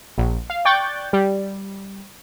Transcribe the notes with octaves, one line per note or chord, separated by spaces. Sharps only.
A#1
F5
D5 G5 C#6 F#6 G6 A6
G3